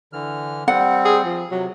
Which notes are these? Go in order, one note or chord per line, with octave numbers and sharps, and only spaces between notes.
D3 E3 F6
G3 C4 F#5
G#4
F3
C3 F#3